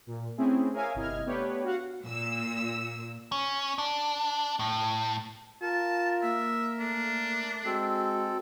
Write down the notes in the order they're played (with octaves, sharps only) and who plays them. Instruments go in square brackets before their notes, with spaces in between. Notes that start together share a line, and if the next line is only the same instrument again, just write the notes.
[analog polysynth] A#2
A3 C4 C#4 E4 G#4
G#4 A#4 C#5 E5 F5 G#5
G1 C3 E4 D#5 F6 G#6
A3 B3 D4 G4 B4 C#5
F#4 F5 F#5
[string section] A#2 E6
[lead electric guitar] C#4
D4
A2
[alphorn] F4 [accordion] A#4 [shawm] A5
[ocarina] A#3 [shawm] E5
[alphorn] A3 [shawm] D4
[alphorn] G#3 [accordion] C4 A4 [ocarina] F#4